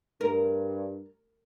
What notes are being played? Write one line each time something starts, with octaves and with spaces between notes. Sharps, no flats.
G2 A#4